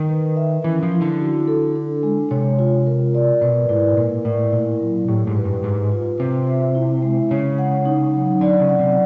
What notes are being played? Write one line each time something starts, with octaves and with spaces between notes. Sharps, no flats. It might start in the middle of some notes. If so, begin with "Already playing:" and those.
Already playing: D#3 A#4
B4
E5
E3 C#4
F3
E4
D3
F#4
A4
D4
G#3
C3 C#5
F4
A#4
D5
B2 B4
G#2 E4
A#2 A#4
A2 D5
A#2 E4
F#3
A2 G4
G#2
B4
G2
G#2 B4
F4
C3 C5
E5
E4
G#3
C#3 C#5
F#5
D#4
F#3
D3 D5
C#3
F#5
C3